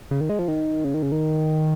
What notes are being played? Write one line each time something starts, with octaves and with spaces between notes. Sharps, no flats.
C#3
D#3
G#3
F3
D#3
C#3
D#3
C#3
D#3